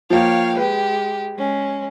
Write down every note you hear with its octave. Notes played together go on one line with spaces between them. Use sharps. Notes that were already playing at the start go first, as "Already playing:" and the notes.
F3 A#3 C#5 F5 G5
G#3 G4 B4
G#3 C#4